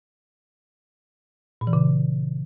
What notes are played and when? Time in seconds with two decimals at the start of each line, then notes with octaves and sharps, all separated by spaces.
1.61 A#2
1.67 E3
1.73 C#3